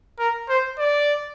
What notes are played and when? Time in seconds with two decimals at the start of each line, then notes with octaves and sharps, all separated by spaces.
0.19 A#4
0.49 C5
0.79 D5